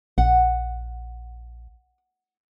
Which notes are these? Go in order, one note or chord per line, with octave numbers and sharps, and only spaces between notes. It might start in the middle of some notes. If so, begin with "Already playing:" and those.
A#1 F#5